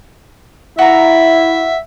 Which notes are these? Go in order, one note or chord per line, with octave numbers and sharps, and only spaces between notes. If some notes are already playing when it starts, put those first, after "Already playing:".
E4 F#4 E5 A#5